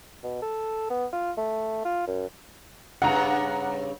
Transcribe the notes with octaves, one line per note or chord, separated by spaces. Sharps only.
B2
A4
B3
F4
A3
F4
F#2
G2 C#3 F#5 A#5